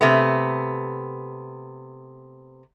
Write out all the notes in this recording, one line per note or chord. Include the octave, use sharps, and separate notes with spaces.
C3 A3 B3